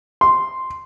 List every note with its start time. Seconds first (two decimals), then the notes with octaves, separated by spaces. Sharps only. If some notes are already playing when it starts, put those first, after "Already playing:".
0.21 C6